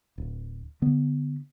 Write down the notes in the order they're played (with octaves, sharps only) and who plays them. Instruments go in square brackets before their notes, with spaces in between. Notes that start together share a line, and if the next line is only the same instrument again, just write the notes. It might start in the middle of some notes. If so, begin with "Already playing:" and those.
[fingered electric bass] D1
D3 B3